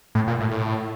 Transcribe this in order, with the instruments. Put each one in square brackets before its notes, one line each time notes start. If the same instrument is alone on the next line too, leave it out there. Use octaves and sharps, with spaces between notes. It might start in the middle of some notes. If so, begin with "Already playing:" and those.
[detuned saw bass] A2
A#2
A2
A2